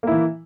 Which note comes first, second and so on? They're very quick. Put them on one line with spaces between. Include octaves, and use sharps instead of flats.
A#3 E4 E3